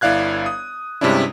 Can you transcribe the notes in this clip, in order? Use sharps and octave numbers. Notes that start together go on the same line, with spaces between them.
G1 E4 D5 F5 F#6 G#6
D#6
G2 C3 G#3 C#4 D4 E4